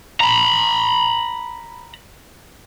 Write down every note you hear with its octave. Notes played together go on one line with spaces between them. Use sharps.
A#5 B5